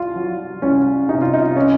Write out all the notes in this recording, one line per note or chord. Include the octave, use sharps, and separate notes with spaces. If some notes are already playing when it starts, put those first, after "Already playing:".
Already playing: C2 F4
F#3
C2 C#4
C3 D#4
F4
D#4
C#4